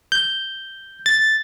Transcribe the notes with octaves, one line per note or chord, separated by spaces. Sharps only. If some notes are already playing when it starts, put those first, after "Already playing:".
G6
A6